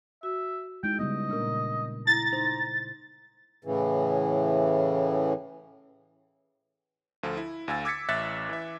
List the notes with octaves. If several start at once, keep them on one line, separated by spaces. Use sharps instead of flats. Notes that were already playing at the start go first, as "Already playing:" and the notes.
F#4 E5
G#3 D#4 E4 G5
C#3 G3 B3 D#5
A#2 C#3 A#3 D4 A#4
E4 A#5 A6
D#4 C5
A2 C#3 E3
D2 F3 F4 A4
E4
D2 F5 G#5 E6 A6
D6 E6 G#6 A6 B6 C#7
A1 E5 F#6 A6 B6 C#7
E3 E5